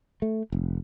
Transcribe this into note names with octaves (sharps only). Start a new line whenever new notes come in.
A3
F1